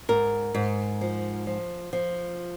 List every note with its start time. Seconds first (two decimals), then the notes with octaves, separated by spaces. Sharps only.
0.09 G#2 A#4
0.54 G#2
1.01 F3
1.47 F3
1.93 F3